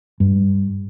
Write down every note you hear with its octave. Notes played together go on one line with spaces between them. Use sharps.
G2